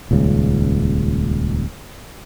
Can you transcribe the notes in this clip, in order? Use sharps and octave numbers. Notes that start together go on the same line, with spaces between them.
D#1 C#2 C#3